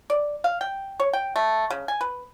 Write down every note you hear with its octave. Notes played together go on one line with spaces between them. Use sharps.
D5
F5
G5
C#5
G5
A3
C#3
G#5
B4